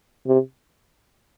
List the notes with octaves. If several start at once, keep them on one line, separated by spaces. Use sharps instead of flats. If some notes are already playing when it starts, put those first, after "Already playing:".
C3